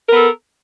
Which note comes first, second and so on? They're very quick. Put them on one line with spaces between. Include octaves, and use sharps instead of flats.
A#4 B3 A4